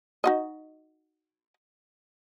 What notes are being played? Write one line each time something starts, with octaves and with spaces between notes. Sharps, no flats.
D#4 F#4 D#5